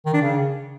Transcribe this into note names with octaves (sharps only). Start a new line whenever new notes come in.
D#3
D4
C#3